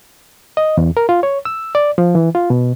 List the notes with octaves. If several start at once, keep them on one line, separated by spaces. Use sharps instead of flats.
D#5
E2
A#4
F4
C#5
E6
D5
F3
E3
F4
B2